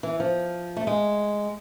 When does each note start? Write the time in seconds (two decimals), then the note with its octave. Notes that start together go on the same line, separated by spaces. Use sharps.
0.03 E3
0.20 F3
0.77 A3
0.87 G#3